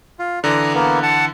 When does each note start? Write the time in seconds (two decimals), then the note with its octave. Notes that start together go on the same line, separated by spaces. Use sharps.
0.19 F4
0.44 D3 E3 D5 A#5 D#6
0.75 A#3 B3
1.03 F#5 A5